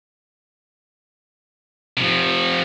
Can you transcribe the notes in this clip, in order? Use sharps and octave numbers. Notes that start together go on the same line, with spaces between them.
C3 F3